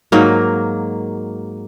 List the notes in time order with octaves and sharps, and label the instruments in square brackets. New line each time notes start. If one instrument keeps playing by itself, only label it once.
[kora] G#2 F#3 A#3